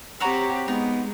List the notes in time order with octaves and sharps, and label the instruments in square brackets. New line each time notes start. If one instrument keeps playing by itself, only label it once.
[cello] C4 G4 [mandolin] F#4 C#5 A#5
[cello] G#3 [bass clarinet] B3 [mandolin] D#4